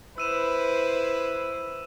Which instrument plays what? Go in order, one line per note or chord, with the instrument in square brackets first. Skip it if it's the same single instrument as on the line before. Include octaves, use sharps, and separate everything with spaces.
[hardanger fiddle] E4 C5 [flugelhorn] B4 [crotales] E6 D#7 E7